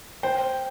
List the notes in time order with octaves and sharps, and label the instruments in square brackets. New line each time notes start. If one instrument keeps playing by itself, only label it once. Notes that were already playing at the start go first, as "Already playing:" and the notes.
[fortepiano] C5 [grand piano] G5